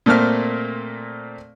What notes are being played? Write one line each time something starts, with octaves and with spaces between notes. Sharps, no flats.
A#2 A3 A#3 C4 F6